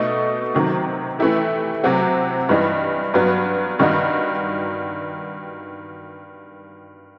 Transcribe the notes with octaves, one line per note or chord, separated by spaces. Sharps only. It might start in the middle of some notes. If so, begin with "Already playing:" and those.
Already playing: B2 A3 D#4
C3 D#3 F#3
E3 A3 E4 G4
C3 F#3 C4 F#4
G2 E3 G3 D#4
G2 F#3 B3
G2 D#3 G3 D#4 F#4